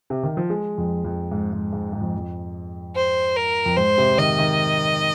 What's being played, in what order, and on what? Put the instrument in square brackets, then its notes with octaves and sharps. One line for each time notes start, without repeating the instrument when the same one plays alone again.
[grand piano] C3
D#3
F3
G#3
F2
F2
G#2
G#2
G#2
G#2
F2
F2
[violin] C5
A#4
[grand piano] F2
[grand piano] G#2 [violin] C5
[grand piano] C3
[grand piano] D#3 [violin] D#5
[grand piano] D#3